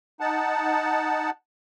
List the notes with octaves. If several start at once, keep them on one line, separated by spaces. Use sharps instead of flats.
D#4 F#5 A5